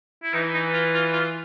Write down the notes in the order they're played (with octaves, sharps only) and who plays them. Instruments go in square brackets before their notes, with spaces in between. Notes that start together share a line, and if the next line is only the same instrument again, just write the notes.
[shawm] E4
[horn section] E3 [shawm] D#4
[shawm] D#4
F4
F4
F4